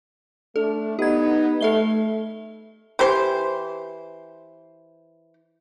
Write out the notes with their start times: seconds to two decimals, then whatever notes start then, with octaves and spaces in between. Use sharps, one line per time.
0.56 A3 D4 A4
0.99 B3 D#4 G4 G#6
1.61 A3 A4 E5 G7
2.99 E3 G4 C5